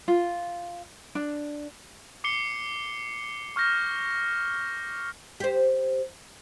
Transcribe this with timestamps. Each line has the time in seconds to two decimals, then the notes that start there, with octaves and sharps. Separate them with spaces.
0.08 F4
1.15 D4
2.24 D6 C7 C#7 G7
3.56 C#6 F6 G6 A#6
5.40 G4 C5